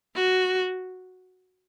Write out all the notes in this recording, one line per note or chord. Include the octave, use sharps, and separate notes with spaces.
F#4